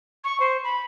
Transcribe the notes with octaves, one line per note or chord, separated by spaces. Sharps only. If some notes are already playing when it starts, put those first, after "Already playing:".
C#6
C5
B5